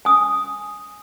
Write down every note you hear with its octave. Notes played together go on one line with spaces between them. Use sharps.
G#5 D#6